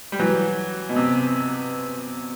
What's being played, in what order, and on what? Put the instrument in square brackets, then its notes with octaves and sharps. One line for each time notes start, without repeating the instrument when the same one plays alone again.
[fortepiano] G3
E3 F#3
B2
C3